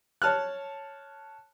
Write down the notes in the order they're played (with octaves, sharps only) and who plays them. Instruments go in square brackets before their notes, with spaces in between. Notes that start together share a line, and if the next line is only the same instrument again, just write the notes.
[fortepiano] C#5 A5 F6 F#6